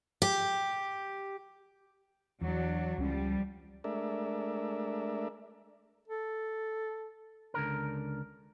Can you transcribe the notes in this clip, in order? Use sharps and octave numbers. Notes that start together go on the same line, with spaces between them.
G4
E2 F#3 D4
C#2 F3 G3 C#4
G#3 A3 D4 A#4 D5 E5
A4
C#2 D3 A#4